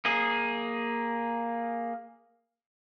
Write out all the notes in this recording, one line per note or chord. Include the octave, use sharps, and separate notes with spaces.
A#3 G#4